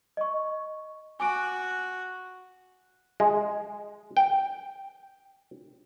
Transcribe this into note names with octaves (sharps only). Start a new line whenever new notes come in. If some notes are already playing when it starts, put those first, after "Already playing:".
D#5 C#6
F#4 G#5 D6 D7
G#3
G5